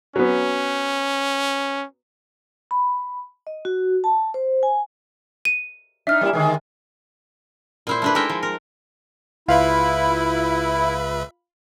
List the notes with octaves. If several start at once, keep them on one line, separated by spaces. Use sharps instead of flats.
F#3 B3 C#4
B5
D#5
F#4
A5
C5
G#5
D#7
D4 D#4 E5 F6
G3 A#3 E4
D3 D#3 G#3
A#2 E4 C5
A3 D4 B4
G#3 D#4 E4 A#4 E5 G5
F3
A#4
C#2 E4 F4 B4 E5 F5 B5